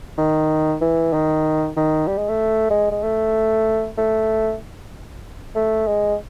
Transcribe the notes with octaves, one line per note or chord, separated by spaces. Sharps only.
D#3
E3
D#3
D#3
G3
G#3
A3
G#3
G#3
A3
A3
A3
G#3